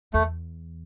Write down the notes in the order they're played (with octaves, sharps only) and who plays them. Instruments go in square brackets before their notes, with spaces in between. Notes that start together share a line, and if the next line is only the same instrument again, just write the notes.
[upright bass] E2 [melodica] A3